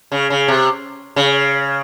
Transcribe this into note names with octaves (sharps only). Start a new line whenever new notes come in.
C#3
C#3
C3
C#3